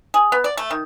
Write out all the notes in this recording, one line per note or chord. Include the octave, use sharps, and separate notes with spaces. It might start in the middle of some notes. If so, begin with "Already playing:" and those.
G#4
B3
D5
A3
D#3